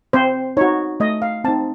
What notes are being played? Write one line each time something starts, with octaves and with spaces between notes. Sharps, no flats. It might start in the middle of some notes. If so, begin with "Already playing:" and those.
C4 C5
D#4 F#4 C#5
A3 D#5
F5
C4 D#4 A5